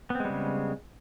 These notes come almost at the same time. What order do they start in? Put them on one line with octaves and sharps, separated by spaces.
B3 C4 G#3 G3 C#3